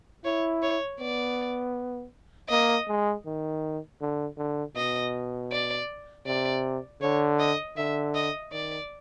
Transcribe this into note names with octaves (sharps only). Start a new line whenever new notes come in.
E4 C#5
C#5
B3 D5
A#3 D#5
G#3
D#3
D3
D3
B2 D#5
D5
C3 D5
D3 C#5
D#5
D3 E5
D#5
D#3 D5